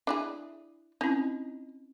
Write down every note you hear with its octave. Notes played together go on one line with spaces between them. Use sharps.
D4 E4 G#4
C4 C#4 D#4 E4